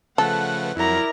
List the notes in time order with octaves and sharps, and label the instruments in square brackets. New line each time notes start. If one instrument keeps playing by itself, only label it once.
[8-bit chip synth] C#3 F3 A3 [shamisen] A4 [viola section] B4 F#5
[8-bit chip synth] F2 F#3 [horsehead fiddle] E4 A#5 [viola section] A#4 D5